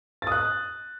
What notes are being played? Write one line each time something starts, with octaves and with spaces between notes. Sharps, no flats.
D#6 F#6 A6